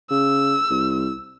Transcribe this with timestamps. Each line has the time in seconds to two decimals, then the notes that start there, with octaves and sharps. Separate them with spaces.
0.11 C#3 E6
0.70 C2